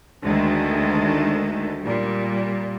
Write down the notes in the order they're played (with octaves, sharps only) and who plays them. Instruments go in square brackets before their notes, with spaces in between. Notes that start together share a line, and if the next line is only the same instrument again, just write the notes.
[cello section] D2 D#3 G#3 A3
A#2 G3